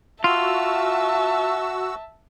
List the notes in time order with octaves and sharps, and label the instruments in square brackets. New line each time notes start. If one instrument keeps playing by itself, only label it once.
[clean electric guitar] F4 [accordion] F#4 E6 [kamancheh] E5 A5